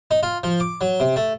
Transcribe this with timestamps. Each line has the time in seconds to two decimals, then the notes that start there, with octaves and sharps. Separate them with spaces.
0.11 D#4
0.23 F4
0.43 F3
0.60 D6
0.81 F#3
1.00 C3
1.16 A3